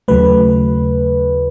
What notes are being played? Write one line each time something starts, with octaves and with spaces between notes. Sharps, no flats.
D#2 C#3 F#3 A3 B4